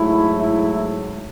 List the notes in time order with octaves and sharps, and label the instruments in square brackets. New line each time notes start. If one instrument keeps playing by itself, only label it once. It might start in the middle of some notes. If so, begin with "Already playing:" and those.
Already playing: [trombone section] G#2 F#3 A3 E4
E4